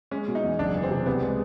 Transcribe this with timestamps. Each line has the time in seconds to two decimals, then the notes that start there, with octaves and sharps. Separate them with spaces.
0.11 G#3 C#4
0.28 B2
0.35 D#4
0.43 E2
0.59 F#1 D4
0.75 E3
0.83 C4
0.91 C3
1.06 C2 B3
1.22 G#3